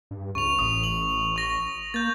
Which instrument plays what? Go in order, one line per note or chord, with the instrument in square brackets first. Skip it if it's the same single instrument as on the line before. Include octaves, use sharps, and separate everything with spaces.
[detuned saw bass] G2
[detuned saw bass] C#2 [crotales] C#6 F7
[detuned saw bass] A1 [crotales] D#6 F7
[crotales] F#7
C#6 A#6
[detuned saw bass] A#3 [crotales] G6 A6